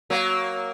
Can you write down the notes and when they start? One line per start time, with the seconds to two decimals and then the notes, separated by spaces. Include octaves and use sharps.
0.10 F#3 A#3